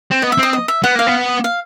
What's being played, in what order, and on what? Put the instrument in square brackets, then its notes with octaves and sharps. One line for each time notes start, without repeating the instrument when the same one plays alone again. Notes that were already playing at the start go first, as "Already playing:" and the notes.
[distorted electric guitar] C4
[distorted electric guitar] B3 [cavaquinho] D#5
[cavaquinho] E5
[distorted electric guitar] C4 [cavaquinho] D#5
[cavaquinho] D#5
E5
[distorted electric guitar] B3 [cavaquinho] F#5
[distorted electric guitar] A#3 [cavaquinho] F5
[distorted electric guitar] B3
[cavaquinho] F5